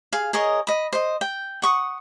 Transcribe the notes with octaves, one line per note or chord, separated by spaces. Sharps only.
G#4 F5
G#4 A#4 C#5 D#5
D#5 B5
C5 D#5
G5
F#5 C#6 D#6